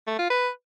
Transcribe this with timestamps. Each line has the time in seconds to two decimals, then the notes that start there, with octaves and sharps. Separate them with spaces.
0.07 A3
0.18 F4
0.30 B4